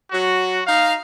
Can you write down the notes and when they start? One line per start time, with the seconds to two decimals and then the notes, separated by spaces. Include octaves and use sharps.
0.12 F#3 F#4
0.67 D#4 F5